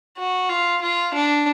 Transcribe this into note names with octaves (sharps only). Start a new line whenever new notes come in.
F#4
F4
F4
D4